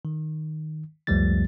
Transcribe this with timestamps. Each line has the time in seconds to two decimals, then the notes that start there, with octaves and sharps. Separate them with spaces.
0.05 D#3
1.07 C#2 F#2 F3 G3 A3 A6